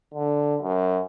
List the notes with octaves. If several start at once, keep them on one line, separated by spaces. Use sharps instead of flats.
D3
F#2